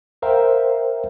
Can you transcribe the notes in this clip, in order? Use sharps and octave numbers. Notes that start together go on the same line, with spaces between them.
A#4 C5 E5 F5 G5 A#5